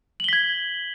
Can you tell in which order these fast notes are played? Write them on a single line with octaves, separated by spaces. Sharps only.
F#7 G7 B6 G#6